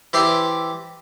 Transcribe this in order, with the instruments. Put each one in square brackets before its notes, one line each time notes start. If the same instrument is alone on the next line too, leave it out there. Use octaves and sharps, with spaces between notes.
[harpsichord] E3 G4 C5 D5 E5 C6